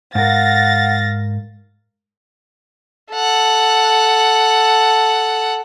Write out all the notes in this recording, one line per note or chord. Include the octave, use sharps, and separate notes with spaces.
G#2 A#4 F5 F#5 A6 A#6
A4 F#5